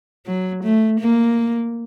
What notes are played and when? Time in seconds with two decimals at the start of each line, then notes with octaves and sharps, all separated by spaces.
0.27 F#3
0.64 A3
1.00 A#3